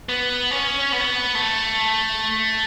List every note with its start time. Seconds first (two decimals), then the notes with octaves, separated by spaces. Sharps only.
0.09 B3
0.51 C#4
0.92 B3
1.35 A3